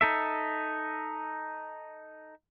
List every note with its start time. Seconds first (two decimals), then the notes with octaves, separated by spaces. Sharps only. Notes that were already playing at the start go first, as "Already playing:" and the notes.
0.01 D#4 A4 E5